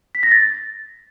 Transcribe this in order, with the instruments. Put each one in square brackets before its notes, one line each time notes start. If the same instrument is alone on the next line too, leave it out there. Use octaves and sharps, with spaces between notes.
[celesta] B6
A#6
A6